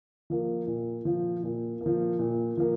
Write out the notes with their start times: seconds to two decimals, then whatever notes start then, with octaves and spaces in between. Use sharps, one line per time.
0.30 F3 A#3
0.67 A#2
1.05 F3 A#3
1.43 A#2
1.81 A#3
1.86 F3
2.19 A#2
2.57 F3 A#3